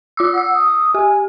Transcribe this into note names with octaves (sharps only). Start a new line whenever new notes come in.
F4 D6 E6
F#5 D6 E6
D#6
G4 G#5